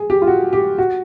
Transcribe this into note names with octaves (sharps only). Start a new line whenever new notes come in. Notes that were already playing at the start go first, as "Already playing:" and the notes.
Already playing: G#4
G4
F4
F#4
G4
F#4